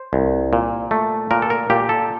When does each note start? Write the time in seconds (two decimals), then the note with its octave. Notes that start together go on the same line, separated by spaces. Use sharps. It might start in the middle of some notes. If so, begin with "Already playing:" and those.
Already playing: C5
0.13 C2
0.53 A#2
0.91 A3
1.31 A#2 A#4
1.42 A4
1.50 A#4
1.70 A#2 G4
1.89 A4